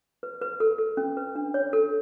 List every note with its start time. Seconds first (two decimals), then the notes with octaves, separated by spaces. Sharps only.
0.23 B4
0.41 B4
0.60 A4
0.79 A4
0.97 C#4
1.17 B4
1.35 D4
1.54 C#5
1.73 A4